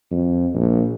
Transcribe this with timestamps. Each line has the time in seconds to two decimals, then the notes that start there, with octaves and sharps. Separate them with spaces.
0.11 F2
0.54 A#1